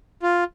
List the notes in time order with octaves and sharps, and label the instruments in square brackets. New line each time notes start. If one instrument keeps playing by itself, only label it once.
[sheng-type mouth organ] F4